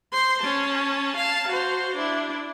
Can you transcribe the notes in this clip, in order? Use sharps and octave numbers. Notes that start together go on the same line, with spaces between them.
C5 C6
C#4 A5
F5 A5
F#4 C5
D4 E4